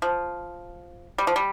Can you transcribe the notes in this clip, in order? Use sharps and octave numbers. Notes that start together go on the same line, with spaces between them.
F3
G3
F3
G3